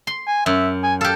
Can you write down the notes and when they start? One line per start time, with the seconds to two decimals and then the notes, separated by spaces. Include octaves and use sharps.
0.07 C6
0.27 G#5
0.46 F#2 E5
0.84 G#5
1.01 G4 A4 F5